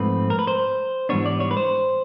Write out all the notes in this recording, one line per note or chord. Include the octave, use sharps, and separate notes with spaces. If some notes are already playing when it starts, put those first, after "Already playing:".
Already playing: G#2 F3 A3 C4 B4
A#4
B4
C5
G#2 E3 G3 B3 D4 C#5
D5
C#5
B4
C5